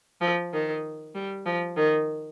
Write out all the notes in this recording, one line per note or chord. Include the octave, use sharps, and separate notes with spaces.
F3
D#3
G3
F3
D#3